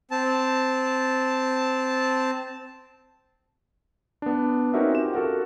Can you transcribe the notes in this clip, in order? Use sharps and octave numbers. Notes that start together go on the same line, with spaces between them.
C4 A5
B3 D4
C4 C#4 D#4 F#4 A#4 E5
F4 G4 E7
F#4 A4 A#4 F#5